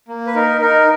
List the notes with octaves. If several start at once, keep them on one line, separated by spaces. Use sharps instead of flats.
A#3
B4
D#4 A#4
D#4 A#4